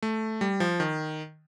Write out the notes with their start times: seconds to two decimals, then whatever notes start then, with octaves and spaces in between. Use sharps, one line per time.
0.02 A3
0.41 G3
0.60 F3
0.80 D#3